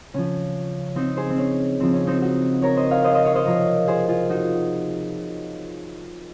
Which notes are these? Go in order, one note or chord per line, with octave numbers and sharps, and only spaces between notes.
C#3 F3 C#4
C4 D#4
G#4 C5
C4
C#4
C#3 F3 C4
C#4
C4 D#4
D#4 F#4
A#4 C#5
C5 D#5
C#5 F5
C5 D#5
C5 D#5
C#5 F5
C5 D#5
C3 F3 A#4 C#5
G#4 C5
F4 G#4
D#4 F#4